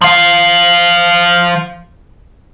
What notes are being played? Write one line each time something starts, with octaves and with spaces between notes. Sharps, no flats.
F3 F5